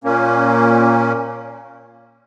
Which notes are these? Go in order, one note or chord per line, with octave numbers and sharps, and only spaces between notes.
A#2 A#3 C#4